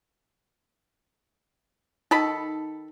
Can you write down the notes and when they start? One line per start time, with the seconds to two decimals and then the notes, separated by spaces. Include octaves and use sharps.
2.11 D#3 D#4 A4 B5